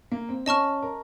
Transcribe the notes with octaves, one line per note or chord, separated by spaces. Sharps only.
A#3
C4
C#4 D#5 A5 C#6 F6
A#4